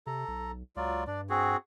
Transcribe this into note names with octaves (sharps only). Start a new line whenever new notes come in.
C3 A4 A#5
B1
C#2 F#3 F4 D5
G2 D4 D5
C4 F#4 G#4